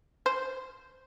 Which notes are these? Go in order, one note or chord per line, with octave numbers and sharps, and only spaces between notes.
C5